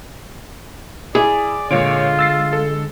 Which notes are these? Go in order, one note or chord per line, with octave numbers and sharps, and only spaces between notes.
E4 G#4 D5
A#2 D3 G#3 F4 C#5 D7
E6 A6 C7
A4